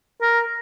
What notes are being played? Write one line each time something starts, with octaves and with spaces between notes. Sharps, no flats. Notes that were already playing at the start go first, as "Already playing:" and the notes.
A#4